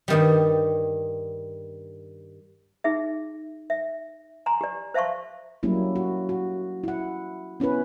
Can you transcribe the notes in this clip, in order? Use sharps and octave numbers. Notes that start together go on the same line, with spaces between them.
G2 D#3 G3
D#4 G#4 E5
E5
G#5 A#5 C6
G4 D5
C5 E5 F5 A5 C6 C#6
F#3 G3 A#3 C#4 E4
F#4
F#4
E4 F#5
B3 C#4 E4 B4